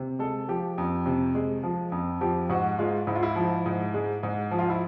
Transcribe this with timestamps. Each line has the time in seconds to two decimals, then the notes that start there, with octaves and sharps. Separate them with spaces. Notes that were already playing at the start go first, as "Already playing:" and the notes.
Already playing: C3
0.19 G#3 A4
0.48 F3 G4
0.78 F2
1.06 C3
1.35 G#3
1.63 F3
1.92 F2
2.21 F3 G4
2.49 G#2 F#4
2.79 G#3 F4
3.07 G#2 E4
3.15 F4
3.23 E4
3.36 F3
3.66 G#2
3.94 G#3
4.23 G#2
4.51 F3
4.59 F4
4.70 E4